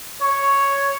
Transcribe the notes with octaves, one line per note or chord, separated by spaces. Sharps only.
C#5